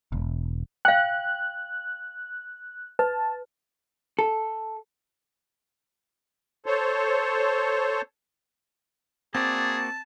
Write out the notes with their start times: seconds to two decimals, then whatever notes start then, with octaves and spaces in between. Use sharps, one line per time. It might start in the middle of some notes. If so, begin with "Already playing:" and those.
0.12 E1
0.85 F5 G5 F#6
2.99 B4 A5
4.19 A4
6.66 A4 C5 C#5
9.35 A#3 C4 F#4 G#4 D5 A5